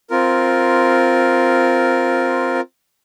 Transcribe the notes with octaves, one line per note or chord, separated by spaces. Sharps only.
C4 F4 A#4